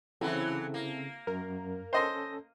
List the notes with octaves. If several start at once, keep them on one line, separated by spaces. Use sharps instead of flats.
C#3 E3 F#3 C4 E4 A4
A#3
F#2 A#4
C#4 A4 C5 D#5 C6